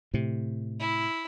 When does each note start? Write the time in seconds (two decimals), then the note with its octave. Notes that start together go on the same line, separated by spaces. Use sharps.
0.14 A2 C3
0.80 E4